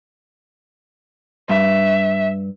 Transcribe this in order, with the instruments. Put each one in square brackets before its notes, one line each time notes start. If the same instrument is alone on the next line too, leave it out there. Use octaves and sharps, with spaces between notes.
[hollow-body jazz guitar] G2 [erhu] E5